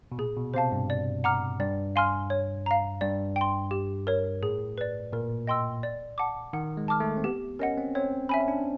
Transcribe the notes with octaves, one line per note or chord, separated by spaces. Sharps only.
B2
A#2 G#4
B2
C3 C5 F5 A5
G2
D5
F#5 A#5 D6 F6
G2 D5
F5 G#5 C6 F6
C#5
F5 A#5
G2 D5
G5
C6
G4
A#4 C#5
A2 G#4
B4 D5
A#2 A#4
D#5 G5 C6 E6
D5
F#5 A5 D6
D#3 F#5
G#3
A5 D6 F6
A3
C4
B3 G4
C#4 A#4 D#5 F#5
C4
C4 C#5
C#4 E5 G#5 B5
C#4
D4